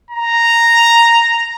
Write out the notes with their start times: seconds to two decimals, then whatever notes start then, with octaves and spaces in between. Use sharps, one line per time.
0.11 A#5